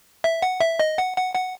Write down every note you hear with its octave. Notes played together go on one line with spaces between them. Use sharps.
E5
F#5
E5
D#5
F#5
F#5
F#5